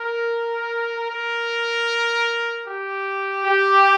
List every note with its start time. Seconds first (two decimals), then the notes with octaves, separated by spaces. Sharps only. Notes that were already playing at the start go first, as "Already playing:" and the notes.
Already playing: A#4
1.11 A#4
2.66 G4
3.44 G4